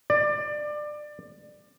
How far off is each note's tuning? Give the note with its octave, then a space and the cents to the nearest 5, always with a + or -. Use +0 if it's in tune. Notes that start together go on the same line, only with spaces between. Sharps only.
D5 +20